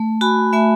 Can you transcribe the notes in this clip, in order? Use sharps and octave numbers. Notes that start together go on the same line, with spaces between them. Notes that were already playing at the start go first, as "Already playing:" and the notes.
Already playing: A3
F#4 G#5 B5
A3 E5 G#5